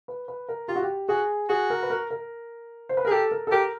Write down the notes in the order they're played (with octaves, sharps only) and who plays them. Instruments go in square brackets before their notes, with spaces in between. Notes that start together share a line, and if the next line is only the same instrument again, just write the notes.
[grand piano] B4
B4
A#4
[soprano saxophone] F4 [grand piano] G4
[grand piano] F#4
G4
[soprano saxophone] F#4 [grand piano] G#4
[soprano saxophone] F#4 [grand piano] G#4
[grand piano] A#4
B4
A#4
A#4
C5
B4
[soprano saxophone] G#4 [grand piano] A#4
[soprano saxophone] G4 [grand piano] A4
[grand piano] A#4
A4
[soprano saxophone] G4 [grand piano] A#4